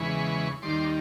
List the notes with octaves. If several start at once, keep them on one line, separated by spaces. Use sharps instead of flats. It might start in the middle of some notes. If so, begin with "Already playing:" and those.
Already playing: E2 C#3 E3 G#3 B5 C#6
D#2 D#3 G3 C6 D6